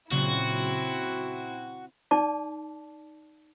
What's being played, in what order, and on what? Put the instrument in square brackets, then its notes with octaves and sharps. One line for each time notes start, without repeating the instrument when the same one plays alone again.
[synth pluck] A#2 C#3 F#3 [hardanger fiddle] C4 E4 [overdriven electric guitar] F#4
[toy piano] D#4 D5 A5 D6